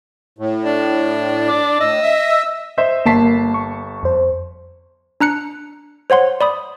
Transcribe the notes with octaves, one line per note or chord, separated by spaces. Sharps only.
A2
D4
D6
A2 D#5 E6
E5
C5 D#5 E5
G1 A#3 A5 B6 C7
C#6
F2 C5
D4 A#5 F#6 C#7
C5 C#5 F#5 C6
D5 B5 D#6